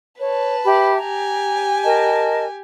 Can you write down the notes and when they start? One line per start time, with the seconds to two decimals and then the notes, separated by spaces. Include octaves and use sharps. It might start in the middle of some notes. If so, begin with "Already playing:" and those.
0.21 B4 C#5 A5
0.64 G4 E5 B5
0.97 G4 G#5 A#5
1.83 A#4 D#5 A5